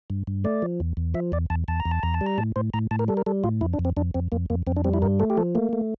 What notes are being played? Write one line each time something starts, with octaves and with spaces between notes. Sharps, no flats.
G2
G2
A3 D5
F3
E2
E2
F3 E5
E2 D5
E2 A5
E2 A5
A#5
E2
A5
E2 A#5
A5
G3
A#5
A2 A5
A2 C5
A2 A#5
A2 A5
A#4
G3 A4
A#4
G3 A4
A2 F4
F2 E4
D4
F2
C4
F2 D4
F2 C4
F2 A#3
F2 A#3
F2 C4
D4
G3 C4
E4
G2 A#4
A3 A4
G4
F3 A4
A3 A#3
A3